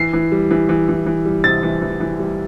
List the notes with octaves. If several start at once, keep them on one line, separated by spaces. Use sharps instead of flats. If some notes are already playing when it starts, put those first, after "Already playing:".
Already playing: E3 C7
E3
G3
E3
E3
E3
E3
G3
C3 A6
E3
E3
E3
G3